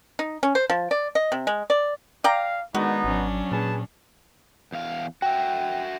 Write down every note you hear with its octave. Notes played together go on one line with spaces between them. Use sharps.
D#4
C#4
C5
F3
D5
D#5
C3
G#3
D5
D5 F5 G5 A#5
D#3 G#3 B3 D4 D#4 F#4
G#1 F#3 C#4 D4
A#2 G#4 B4 A5
E2 F5
F#4 E5 G5